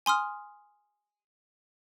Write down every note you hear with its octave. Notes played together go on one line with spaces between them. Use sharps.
G#5 C6 D#6 F6